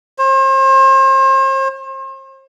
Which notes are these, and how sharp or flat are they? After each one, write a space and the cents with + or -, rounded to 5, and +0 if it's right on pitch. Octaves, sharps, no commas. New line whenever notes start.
C5 +40